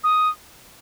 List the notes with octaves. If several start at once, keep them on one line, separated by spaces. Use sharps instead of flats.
D#6